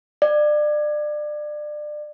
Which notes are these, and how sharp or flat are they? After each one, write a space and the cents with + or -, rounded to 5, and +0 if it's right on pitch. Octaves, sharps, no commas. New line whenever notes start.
D5 +30